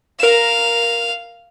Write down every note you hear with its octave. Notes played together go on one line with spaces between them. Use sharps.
A#4 F5 E7